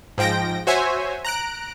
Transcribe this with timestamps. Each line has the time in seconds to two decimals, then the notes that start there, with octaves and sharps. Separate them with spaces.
0.18 G#2 F3 G5 A#6 D7
0.67 F#4 C5 C#5 E5 G#5
1.25 A#5 F#6 D7